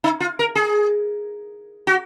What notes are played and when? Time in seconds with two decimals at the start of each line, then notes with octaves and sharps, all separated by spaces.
0.04 D#4
0.20 F4
0.39 A#4
0.55 G#4
1.87 F#4